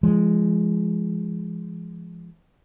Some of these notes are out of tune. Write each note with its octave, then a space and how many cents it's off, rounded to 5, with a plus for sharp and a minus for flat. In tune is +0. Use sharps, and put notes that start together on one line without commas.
F3 -40 G#3 +0